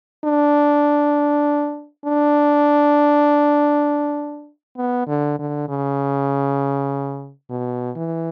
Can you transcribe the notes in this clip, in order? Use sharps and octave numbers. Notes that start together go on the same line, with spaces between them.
D4
D4
B3
D3
D3
C#3
B2
E3